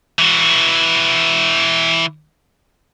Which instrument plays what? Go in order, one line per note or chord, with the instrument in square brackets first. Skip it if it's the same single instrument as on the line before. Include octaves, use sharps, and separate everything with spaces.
[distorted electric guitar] E3 F#4